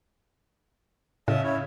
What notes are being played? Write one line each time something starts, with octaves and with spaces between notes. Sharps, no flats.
A2 C#3 D#5 E5 A5
E4 C#5